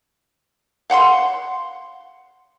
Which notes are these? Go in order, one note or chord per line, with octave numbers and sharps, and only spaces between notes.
F5 F#5 B5 C6